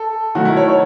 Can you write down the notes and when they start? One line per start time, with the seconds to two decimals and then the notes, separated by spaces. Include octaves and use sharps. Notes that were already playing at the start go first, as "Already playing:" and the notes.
Already playing: A4
0.35 D#3 F#3 A3 F#4
0.45 E4
0.57 C#5
0.68 C#5